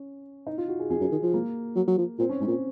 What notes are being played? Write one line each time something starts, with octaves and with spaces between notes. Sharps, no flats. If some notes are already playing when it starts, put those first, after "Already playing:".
Already playing: C#4
D#4
F4
F#4
G#4
F2 G#4
F#2
D#3
F3
A#3
F#3
F#3
F3
A#2 C4
C#4
G#2 C#4
A#2
C4